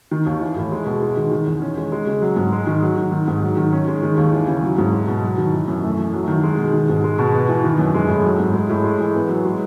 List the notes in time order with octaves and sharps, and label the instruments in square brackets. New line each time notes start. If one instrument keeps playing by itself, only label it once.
[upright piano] D#3
D#2
E3
A2
G#3
B2
G#3
D#3
D#3
E2
C#4
G#3
G#3
C#3
F#3
G#2
G#3
D#3
F#3
D#3
D#3
G#2
F#3
D#3
C#4
G#3
D#3
D#2
E3
C#3
F#3
G#2
G#3
B2
F#3
D#3
E3
F#2
A3
E3
F#3
D#3
G#3
B2
D#3
G#2
G#3
B2
B3
E3
D#3
F#2
G#3
A2
F#3
G#2
G#3
A2
G#3
E3
B3
F#3
G#3